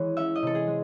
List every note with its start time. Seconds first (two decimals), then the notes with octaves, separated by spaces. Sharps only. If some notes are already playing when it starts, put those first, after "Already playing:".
Already playing: E3 G#3 C#5
0.17 C#4 E5
0.35 D#5
0.42 C3 A4
0.55 G#4
0.67 G#3